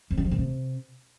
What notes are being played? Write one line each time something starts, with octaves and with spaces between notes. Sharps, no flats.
F2
C#3
F3
A#2
C3